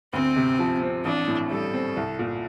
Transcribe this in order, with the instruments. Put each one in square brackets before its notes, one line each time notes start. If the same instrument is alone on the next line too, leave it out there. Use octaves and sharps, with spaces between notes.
[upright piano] D2 [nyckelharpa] C4
[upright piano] C3
F3
C4
[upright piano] A1 [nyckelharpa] D4
[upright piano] A2
[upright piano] G3 [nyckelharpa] A4
[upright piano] C4
C2
A#2